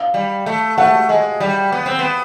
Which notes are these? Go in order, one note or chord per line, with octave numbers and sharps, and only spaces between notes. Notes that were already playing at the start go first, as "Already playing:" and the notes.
Already playing: F5
G3
A3
A3 E5 F#5
G#3
G3
B3
C4
B3